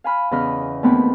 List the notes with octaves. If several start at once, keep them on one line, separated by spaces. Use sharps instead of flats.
F5 G#5 B5 F6
E2 C#3 D#5 B5 F6
D#2 A3 B3 C4 B5